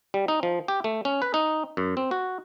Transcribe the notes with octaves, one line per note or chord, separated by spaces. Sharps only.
G3
D#4
F3
G4
A3
C#4
B4
D#4
F#2
C4
F#4